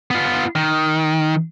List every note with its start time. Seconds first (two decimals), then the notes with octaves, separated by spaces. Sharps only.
0.11 B3 F4
0.55 D#3